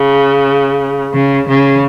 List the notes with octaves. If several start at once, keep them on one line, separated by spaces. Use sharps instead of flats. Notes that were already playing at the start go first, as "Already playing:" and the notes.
Already playing: C#3
C#3
C#3